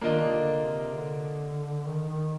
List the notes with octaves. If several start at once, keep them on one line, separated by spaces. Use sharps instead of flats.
D#3 A#3 D4 F4 A#4 D#5
C3
D3
C3
D3
D#3
D#3